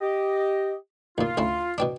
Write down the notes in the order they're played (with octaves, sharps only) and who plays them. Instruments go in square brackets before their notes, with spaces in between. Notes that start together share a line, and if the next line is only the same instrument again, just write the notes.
[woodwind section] G4 D#5
[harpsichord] D#2 A#2 [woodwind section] F4
[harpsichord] D2 C#4 E4
B2 C4 D4